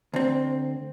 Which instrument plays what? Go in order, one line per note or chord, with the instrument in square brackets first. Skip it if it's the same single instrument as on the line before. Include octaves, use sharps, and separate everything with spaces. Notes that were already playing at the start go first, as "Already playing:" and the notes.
[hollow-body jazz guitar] D2 C4